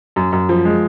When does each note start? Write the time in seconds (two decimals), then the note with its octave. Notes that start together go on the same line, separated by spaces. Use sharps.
0.16 F#2
0.32 F#2
0.49 F3
0.65 G#3